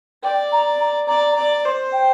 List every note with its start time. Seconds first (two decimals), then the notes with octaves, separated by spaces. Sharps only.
0.23 D5 G5
0.52 A#5
0.80 A#5
1.08 D5 A#5
1.31 A#5
1.37 D5
1.65 C5
1.93 G5